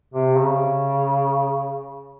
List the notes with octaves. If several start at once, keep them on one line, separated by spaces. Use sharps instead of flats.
C3
C#3